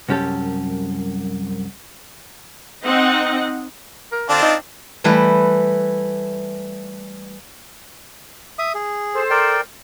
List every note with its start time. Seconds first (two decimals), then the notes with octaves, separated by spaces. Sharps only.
0.09 C2 F#2 C#4 G4 A4
2.85 C4 D#4 D#5 F#5
4.12 A#4
4.29 D3 C4 D4 F4
4.42 D#4
5.04 E3 G3 A3 E4 B4 A5
8.59 E5 D#6
8.75 G#4
9.14 A4 C5
9.30 A#4 D5 G5